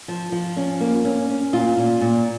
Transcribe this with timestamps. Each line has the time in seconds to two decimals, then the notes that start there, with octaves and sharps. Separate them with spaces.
0.08 F3
0.32 F3
0.57 C#4
0.81 A#3
1.05 C#4
1.29 C#4
1.53 A#2 F4
1.77 A#2
2.01 A#2